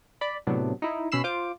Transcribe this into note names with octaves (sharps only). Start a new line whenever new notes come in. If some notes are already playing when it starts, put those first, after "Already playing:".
D5 B5
A2 C3 F#3 B3 D4
D#4 E4
B2 C#4 B5 E6 C7 E7
F4 C5 D6